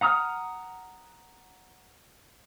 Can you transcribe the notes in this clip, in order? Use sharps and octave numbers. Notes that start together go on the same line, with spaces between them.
F#5 A#5 D#6 F6